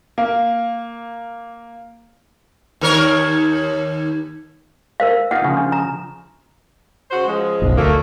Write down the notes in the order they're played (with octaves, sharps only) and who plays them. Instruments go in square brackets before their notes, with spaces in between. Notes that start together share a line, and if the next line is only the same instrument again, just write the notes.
[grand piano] A#3 [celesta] F5
[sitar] D#2 A#4 C#5
[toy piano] A#4 C5 F5
[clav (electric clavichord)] A#3 D#4 F4 [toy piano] F#5
[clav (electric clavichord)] C#3 F3
[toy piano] D4
A#5
[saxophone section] C#3 F#4 C5
C#3 F3 G#3
[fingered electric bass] F#1 B1
[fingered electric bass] D2 [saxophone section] A3 A#3